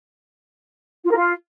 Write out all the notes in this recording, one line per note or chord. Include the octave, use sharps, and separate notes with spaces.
F4
A#4
F4